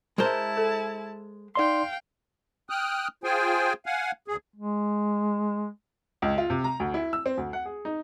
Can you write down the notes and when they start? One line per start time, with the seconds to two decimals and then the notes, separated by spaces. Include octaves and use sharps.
0.18 G#3 E4 A#4 C5 A5
0.57 A4
1.55 D#4 D5 F5 G5 C6
2.70 G5 D#6 F6 F#6
3.24 F4 G#4 C5 G5 G#5
3.86 F5 F#5 G#5
4.28 D2 G#4
4.56 G#3
6.22 C#2
6.38 F4
6.50 C3
6.64 A#5
6.80 D2
6.94 E4
7.13 E6
7.26 C4
7.38 D2
7.53 F#5
7.66 G#4
7.85 D#4